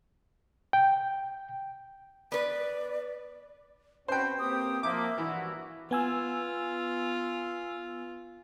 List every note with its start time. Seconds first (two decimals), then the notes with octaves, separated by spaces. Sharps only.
0.73 G5
2.32 B3 B4 D5
4.08 C4 C#4 F#4 B4 C5 G5
4.39 A#3 C4 G4 D#6
4.83 F3 A#3 E5 D6
5.18 G2 E3 F#4
5.91 B3 F4 G#5 E6